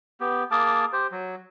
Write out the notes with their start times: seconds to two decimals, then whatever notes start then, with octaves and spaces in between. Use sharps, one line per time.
0.20 B3 G4
0.51 A#3 G#4 A5 D6
0.93 G4 C5
1.12 F#3